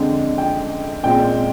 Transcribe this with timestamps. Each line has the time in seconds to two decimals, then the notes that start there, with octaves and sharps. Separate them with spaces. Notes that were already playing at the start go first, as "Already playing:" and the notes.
Already playing: F2 D3 G#3 C4
0.38 G5
1.03 A#2 G#3 C4 G5